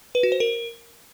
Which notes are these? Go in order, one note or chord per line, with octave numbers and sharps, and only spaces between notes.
B4
F#4
C5
A#4